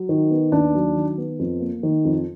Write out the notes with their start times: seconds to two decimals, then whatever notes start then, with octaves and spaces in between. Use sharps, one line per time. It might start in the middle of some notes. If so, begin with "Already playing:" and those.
Already playing: F#3
0.09 D#3
0.31 B3
0.52 D#2 D4
0.74 F#3
0.96 D#3
1.18 B3
1.39 F2
1.60 A#3
1.83 D#3
2.05 F2